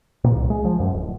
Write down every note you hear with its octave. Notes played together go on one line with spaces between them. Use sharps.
A#2
C2
G#3
F3
F#2
D1